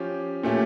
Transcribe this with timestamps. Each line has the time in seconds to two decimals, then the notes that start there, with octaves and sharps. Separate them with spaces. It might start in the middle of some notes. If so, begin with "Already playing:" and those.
Already playing: F3 C#4 G4
0.43 A#2 A3 C#4 G4